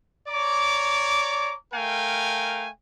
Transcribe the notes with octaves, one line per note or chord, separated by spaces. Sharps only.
C#5 D5 A#5 D6
A3 A#4 F5 G5 G#5